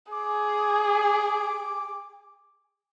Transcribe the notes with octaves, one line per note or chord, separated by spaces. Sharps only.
G#4 D6